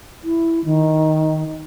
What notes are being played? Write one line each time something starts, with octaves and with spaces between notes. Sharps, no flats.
E4
D#3